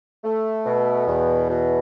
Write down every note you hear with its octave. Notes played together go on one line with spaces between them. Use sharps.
A3
B2
E2
B2